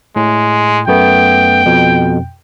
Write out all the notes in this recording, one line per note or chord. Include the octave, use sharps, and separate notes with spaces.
A2 G#3
F#2 A3 B3 G5
F2 B2